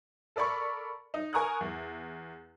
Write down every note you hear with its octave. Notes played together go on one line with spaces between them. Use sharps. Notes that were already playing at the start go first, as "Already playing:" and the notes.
A4 A#4 D5 B5 C#6
D#4
A#4 G#5 A#5 C#6 D#6 F#6
E2